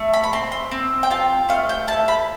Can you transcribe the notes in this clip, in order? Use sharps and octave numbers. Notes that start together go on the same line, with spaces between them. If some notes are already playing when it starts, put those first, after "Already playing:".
Already playing: A3
B5
B5
C4 C6
C6
C4
G5
F4 A5
A3 F5
G5
E4 A5
B5